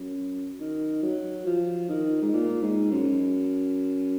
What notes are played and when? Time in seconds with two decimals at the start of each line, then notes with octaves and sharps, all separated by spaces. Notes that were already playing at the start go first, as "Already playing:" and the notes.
Already playing: F#2
0.60 D#3
1.03 F#3
1.46 F3
1.89 D#3
2.22 G#2
2.33 A#2
2.62 G#2
2.91 F#2